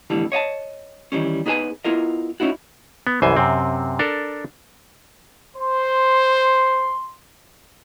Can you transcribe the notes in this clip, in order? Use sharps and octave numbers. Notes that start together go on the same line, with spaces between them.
F2 A2 D3 E3 G3
C#5 D#5 F5 A5
D#3 E3 G3 C#4
B3 D#4 G#4 B4 C5 G#5
B3 E4 F4 A#4 D#5
C#4 D#4 E4 F#4
B3
C2 F#2 E3 C5 G#5
F#2 C3 C4
D4 A4 A#4
C5 C6